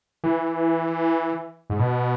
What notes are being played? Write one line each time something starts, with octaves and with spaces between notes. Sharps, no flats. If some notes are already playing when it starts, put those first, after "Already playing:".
E3
G#2
B2